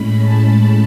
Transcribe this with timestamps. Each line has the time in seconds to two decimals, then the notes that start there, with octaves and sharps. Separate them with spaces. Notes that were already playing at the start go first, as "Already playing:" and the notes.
Already playing: A2 G#3 C#4 B5
0.19 A5